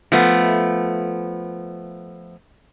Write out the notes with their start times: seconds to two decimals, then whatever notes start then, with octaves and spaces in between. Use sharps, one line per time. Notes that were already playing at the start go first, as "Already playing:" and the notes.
0.12 F3 A3 B3